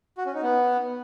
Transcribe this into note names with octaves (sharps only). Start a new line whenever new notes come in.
F#4
C#4
D#4
B3